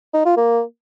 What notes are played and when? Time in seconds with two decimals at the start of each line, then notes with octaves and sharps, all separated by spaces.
0.14 D#4
0.25 F4
0.37 A#3